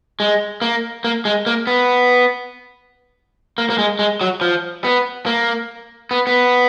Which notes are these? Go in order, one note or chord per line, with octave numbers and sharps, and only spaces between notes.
G#3
A#3
A#3
G#3
A#3
B3
A#3
A#3
G#3
G#3
F#3
F3
B3
A#3
B3
B3